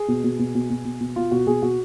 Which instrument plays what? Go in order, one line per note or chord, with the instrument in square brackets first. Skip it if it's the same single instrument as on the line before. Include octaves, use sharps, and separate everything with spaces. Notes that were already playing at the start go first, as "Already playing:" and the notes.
Already playing: [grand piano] G#4
B2
B2
B2
B2
B2
B2
B2
B2 F4
B2 F#4
B2 G#4
B2 F#4